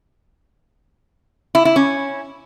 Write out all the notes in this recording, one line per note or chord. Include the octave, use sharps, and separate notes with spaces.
E4
E4
C#4